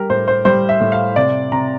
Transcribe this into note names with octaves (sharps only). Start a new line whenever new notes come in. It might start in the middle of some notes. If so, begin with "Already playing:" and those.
Already playing: G3 G4 A#4
A2 C5
C5
G3 C5
E5
A2
F5
C3 D5
C3 A#5